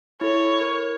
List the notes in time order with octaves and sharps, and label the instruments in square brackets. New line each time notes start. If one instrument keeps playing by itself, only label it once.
[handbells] E4 A4 [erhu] C#5
[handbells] A#4